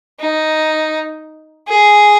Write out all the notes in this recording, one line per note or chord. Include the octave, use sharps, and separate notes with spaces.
D#4
G#4